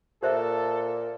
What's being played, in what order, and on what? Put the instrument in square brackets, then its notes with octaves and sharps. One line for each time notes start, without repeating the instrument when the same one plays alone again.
[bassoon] A#2 [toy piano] G4 C5 E5 [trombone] A4